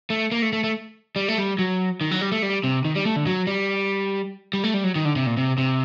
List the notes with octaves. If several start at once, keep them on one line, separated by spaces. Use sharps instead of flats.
A3
A#3
A3
A3
A3
G3
A3
G3
F#3
D#3
F#3
G3
A3
G3
C3
D#3
G3
A3
D3
F#3
G3
G3
A3
G3
F#3
D#3
D3
C3
A#2
C3
C3